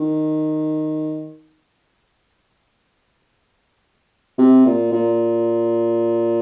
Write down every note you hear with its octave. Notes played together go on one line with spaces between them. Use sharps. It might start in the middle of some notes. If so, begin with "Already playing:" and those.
Already playing: D#3
C3
A#2
A#2